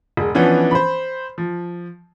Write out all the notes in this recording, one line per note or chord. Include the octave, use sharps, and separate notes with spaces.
E1 G#3
E3 F3 B3 C#4 D4
C5 B5
F3